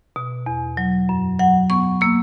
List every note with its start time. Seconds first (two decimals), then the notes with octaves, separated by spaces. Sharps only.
0.16 B2
0.46 E2
0.77 F#3
1.09 F#2
1.39 F#3 F#5
1.70 B3 C#6
2.01 A#3 E6